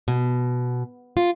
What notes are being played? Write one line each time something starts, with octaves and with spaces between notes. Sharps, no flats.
B2
F4